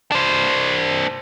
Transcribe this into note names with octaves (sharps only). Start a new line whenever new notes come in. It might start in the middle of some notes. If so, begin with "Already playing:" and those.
D4 C5